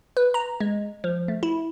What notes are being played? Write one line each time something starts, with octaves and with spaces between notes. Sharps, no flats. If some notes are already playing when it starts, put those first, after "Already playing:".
B4
A#5
G#3
F3
A3
E4